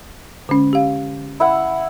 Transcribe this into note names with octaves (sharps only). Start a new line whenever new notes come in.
D3 G#3 C#4
G4 F5
E4 E5 F#5